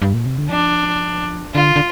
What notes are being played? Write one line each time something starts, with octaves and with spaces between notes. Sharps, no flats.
G2
A#2
C3
D3
F3 D4
D3 F4
D3